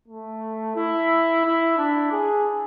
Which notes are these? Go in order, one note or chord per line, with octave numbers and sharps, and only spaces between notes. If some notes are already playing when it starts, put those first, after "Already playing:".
A3
E4
E4
D4
G#4